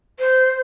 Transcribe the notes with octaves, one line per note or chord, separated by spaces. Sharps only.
C5